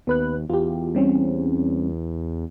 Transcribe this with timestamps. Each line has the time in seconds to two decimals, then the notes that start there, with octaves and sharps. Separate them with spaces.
0.07 D#2 B3 B4 F#6
0.50 E2 F4 G4
0.95 G3 C4 C#4